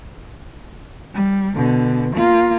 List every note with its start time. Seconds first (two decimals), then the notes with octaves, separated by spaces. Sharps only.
1.14 G3
1.55 B2 D3
2.15 A#3 F4